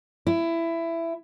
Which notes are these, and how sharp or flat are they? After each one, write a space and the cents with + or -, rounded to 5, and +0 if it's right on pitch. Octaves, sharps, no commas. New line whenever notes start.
E4 +15